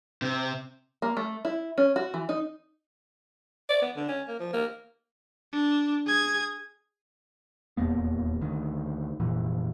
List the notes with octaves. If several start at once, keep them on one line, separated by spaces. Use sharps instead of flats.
C3
A#3
A3
E4
C#4
F#4
E3
D#4
D5
B3
D3
C#4
A#3
F3
A#3
D4
G#4 G#6
D#1 E2 A#3 B3
D2 D#3
F1 A#2 E3